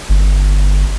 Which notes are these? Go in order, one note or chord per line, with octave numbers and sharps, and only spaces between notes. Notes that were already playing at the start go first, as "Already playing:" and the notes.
G1